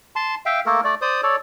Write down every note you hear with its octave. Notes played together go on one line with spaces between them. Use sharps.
A5 C6
E5 F5 G5
A3 A#3 A4 A#4
A3 D5
C5 D5 D#6
A4 C#5 D5